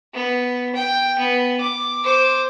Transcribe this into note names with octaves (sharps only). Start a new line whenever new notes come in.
B3
G5
B3
D6
C5 D6